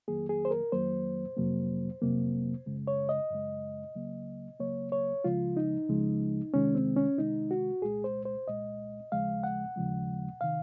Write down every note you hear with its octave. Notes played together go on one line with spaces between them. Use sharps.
F2 D#3 F#3 A#3 G#4
G#4
C5
A#4
F2 D#3 F#3 A#3 C5
F2 C3 F#3 A#3
F2 C3 F#3 A#3
F#2 C#3 G#3
C#5
D#5
F#2 C#3 G#3
C#2 C#3 F#3 A#3
C#2 C#3 F#3 A#3 C#5
C#5
C#2 C#3 F3 G#3 F4
D#4
C#2 C#3 F3 G#3
C2 C3 D#3 G#3 C#4
C4
C#4
C2 C3 D#3 G#3 D#4
F#4
C2 A#2 G#3 G#4
C5
C5
C2 A#2 G#3 D#5
D#2 C#3 F3 G#3 F5
F#5
D#2 C#3 F3 G#3
C3 D#3 F5